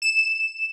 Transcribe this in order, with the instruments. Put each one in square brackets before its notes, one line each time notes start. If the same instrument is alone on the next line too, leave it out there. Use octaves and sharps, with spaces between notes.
[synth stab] E7